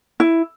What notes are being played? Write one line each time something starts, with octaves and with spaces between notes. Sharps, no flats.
E4